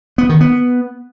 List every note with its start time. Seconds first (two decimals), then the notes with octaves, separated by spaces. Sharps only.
0.18 B3
0.29 D#3
0.41 B3